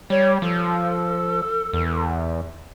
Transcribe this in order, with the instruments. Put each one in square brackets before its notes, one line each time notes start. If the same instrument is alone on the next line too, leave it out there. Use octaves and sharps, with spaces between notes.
[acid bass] G3 [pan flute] C#5
[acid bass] F3 [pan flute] A4
[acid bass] E2